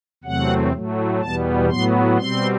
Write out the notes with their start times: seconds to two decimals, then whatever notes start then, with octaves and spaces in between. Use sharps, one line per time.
0.24 E2 C3 F#3 A3 C4 F#5
0.73 A2 F#3 A3
1.21 E2 B2 G3 B3 A5
1.69 A2 F#3 B3 C6
2.18 B2 G3 C4 C6